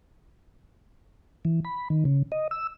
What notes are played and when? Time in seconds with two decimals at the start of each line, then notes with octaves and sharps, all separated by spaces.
1.45 E3
1.65 B5
1.90 D#3
2.05 C#3
2.32 D#5
2.51 E6